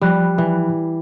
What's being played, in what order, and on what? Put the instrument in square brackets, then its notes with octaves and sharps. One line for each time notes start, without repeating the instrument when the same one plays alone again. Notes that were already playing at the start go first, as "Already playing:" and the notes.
[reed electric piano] F3 B5 F#6 [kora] G3
[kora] E3